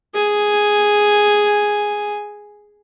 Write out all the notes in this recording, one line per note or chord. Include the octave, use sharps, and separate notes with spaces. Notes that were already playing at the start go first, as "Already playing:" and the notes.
G#4 G#5